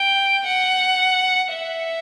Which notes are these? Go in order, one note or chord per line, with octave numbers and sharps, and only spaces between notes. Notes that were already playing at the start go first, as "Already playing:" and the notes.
Already playing: G5
F#5
E5